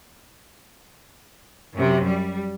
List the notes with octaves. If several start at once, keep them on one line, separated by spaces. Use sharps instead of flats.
F#2 C3
G3